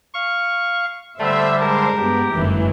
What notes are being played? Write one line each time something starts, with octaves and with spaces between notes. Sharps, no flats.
F5 C#6
D3 G3 A3 C5 E5
G#3 A#4 C5 A5
G2 B3 G4
G1 F#2 A2 D#3 E3